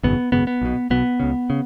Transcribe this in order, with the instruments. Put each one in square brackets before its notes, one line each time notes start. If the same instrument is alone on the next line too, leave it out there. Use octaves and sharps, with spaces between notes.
[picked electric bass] G#1 F#2 C#3 B3
G#1 F#2 C#3 B3
B3
B1 B2
B1 B2 B3
C#2 C#3
C#3